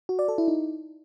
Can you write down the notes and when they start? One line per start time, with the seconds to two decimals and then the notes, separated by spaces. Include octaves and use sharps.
0.09 F#4
0.19 D5
0.28 A4
0.38 E4
0.48 D#4